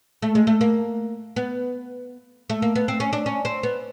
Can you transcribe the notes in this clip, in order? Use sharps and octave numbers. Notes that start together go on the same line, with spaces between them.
A3
G#3
A3
A#3
B3
A3
A#3
B3
C4
C#4
D4
C#4
C4
B3